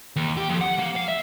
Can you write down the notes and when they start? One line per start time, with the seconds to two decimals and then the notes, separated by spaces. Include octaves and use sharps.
0.16 D#2
0.37 G4
0.49 F2
0.61 F#5
0.79 A#3
0.96 F5
1.08 E5